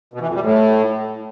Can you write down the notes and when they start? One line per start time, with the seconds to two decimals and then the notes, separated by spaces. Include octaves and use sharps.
0.14 B2
0.21 E3
0.28 F2
0.35 G3
0.42 A2